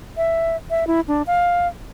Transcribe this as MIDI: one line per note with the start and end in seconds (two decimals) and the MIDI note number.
0.17 0.57 76
0.70 0.87 76
0.87 1.01 64
1.08 1.22 62
1.27 1.67 77